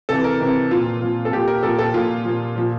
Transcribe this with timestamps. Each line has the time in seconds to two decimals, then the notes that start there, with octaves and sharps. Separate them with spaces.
0.09 C3 E3 A4
0.24 A#4
0.40 C3 E3
0.71 A#2 F3 F4
1.02 A#2 F3
1.25 A4
1.32 A#2 F3 G4
1.48 A#4
1.63 A#2 F3 A4
1.79 A4
1.94 A#2 F3 F4
2.25 A#2 F3
2.56 A#2 F3